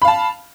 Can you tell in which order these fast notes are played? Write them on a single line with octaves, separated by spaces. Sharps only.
B5 F5 A5